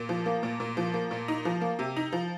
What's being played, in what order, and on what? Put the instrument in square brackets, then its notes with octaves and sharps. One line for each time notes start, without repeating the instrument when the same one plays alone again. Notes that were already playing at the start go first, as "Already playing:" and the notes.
Already playing: [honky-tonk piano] A#2
F3
A#3
A#2
A#2
F3
A#3
A#2
D#4
F3
A#3
C3
D#4
F3